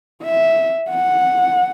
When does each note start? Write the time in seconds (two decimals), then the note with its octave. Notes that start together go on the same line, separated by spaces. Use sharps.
0.24 E5
0.90 F#5